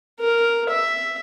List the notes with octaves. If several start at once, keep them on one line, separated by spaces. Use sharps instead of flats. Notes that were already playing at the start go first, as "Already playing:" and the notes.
A#4
E5